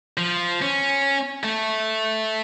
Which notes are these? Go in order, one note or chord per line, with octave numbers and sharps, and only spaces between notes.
F3
C#4
A3